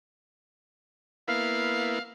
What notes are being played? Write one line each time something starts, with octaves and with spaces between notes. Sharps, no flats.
A#3 B3 E4 F5